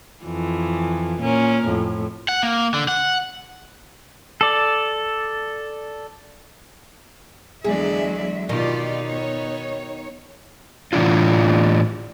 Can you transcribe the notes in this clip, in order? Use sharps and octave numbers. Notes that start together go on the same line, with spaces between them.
F2 E3
A#2 C#4 A#4
F2 A2
F#5
A#3
D3
F#5
A4 D5
E2 D3 F#3 G#3 G#4 D5 E5
B2 D#3 B3 D#4 F4 G4 D5
C#5
A2 E3 D4 F4